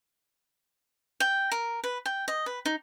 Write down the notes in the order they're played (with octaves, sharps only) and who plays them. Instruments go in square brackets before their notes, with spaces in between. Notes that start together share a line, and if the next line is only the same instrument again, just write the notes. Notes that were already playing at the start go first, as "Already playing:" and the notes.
[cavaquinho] G5
A#4
B4
G5
D#5
B4
D#4